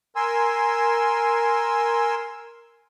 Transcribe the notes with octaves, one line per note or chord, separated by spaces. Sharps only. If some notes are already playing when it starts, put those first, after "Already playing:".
A#4 G#5 C6 E6